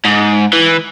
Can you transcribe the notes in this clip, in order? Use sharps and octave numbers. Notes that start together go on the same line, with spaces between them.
G#2
E3